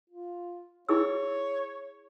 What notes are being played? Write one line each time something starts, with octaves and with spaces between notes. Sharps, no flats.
F4
E4 G#4 C#5 E6